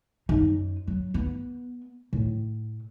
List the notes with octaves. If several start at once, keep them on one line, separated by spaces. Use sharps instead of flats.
F#2 D#4
F#3
B3
A2